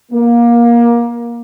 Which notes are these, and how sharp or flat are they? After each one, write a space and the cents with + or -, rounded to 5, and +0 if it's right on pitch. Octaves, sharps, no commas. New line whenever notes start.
A#3 +20